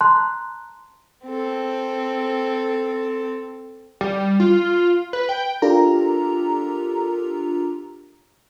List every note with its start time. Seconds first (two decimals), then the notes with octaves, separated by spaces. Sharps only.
0.01 A5 A#5 C6 F#6
1.26 C4 A4
4.01 G3
4.40 F4
5.13 B4
5.29 G5
5.62 D4 F4 G4 A4 A#4 A#5